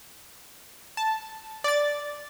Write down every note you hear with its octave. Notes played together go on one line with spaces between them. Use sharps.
A5
D5 A6